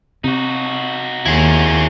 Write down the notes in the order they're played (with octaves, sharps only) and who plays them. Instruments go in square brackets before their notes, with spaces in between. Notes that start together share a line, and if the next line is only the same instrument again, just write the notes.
[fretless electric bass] C3 [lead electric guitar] D#4 F#4
[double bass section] D#2 [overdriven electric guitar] E4 G#4